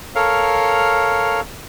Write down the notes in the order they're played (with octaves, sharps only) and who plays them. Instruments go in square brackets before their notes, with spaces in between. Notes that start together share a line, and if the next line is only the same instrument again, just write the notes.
[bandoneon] A4 A#4 C#5 F5